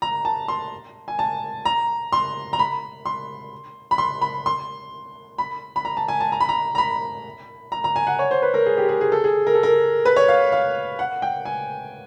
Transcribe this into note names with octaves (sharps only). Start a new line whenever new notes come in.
A#5
A5
C6
G#5
A5
A#5
C6
A#5
B5
C6
B5
C6
B5
C6
B5
B5
A#5
A5
G#5
A5
A#5
B5
A#5
A#5
B5
A#5
A#5
G#5
F#5
C#5
C5
B4
A#4
G#4
G4
G#4
G#4
A4
G#4
A#4
A4
A#4
B4
C#5
F5
F5
F#5
G5
G#5